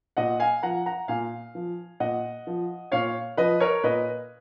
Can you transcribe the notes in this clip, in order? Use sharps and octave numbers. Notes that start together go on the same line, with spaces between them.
A#2 D#5 F#5
F5 G#5
F3 F#5 A#5
F#5 A#5
A#2 F5 G#5
F3
A#2 D#5 F#5
F3
A#2 C#5 F5
F3 B4 D#5
A#4 C#5
A#2 B4 D#5